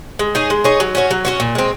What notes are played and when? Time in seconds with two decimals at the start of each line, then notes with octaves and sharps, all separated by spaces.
0.19 G#3
0.35 D#4 G#4 C#5
0.50 G#3
0.64 D#4 G#4 C#5
0.80 F#3
0.95 C#4 F#4 C#5
1.11 F#3
1.25 C#4 F#4 C#5
1.40 A#2
1.55 G#3 C4